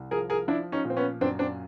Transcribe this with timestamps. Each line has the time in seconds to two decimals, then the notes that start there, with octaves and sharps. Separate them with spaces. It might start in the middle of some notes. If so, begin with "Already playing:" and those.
Already playing: C2
0.11 F3 G#4 A#4
0.30 G#4 A#4
0.48 F3 D4 E4
0.72 C#4 D#4
0.85 A#2
0.90 C4
0.97 B3 C#4
1.21 F#2 C4 D4
1.39 C4 D4